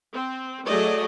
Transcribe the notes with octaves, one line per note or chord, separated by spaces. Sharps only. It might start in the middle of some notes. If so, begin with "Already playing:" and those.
C4
F#3 A3 G#4 D5 D#5